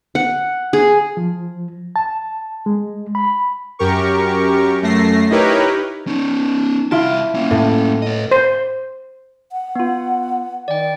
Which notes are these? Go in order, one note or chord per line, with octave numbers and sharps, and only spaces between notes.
F#5
G#4
F3
A5
G#3
B5
F#2 G4 A#4 C#6
F#2 A3 A#6 C7
D#4 E4 G4 A#4 B4 C#5
C#4 D#4
C2 E4 F4 A5 D7
A#3 C#4
A2
C#5 D#5
C5
F#5
B3 F4
D#3 D5 G5